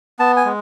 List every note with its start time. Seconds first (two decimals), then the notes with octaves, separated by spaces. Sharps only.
0.19 B3 A5
0.37 G#5
0.45 G#3